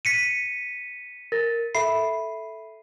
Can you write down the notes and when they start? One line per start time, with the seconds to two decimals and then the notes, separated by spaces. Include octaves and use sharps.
0.05 B6 C#7 D#7
1.32 A#4 A6 A#6
1.75 A4 E5 B5 C7